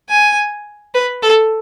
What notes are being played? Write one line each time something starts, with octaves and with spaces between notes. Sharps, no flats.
G#5
B4
A4